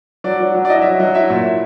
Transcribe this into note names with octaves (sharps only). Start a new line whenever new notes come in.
F#3 D5
F#3
F#3
D5
E4 D#5
E5
F#3
F#3 D#5
E4 E5
A#2
E4